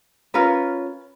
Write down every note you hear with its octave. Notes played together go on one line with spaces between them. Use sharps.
C#4 F4 A#4 B4